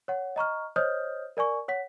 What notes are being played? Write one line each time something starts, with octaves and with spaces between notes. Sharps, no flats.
C#5 F#5
D#5 A#5 C#6 F6
C5 C#5 D#5 D#6 F6 G6
A#4 D5 G#5 C#6
C#5 F#5 B6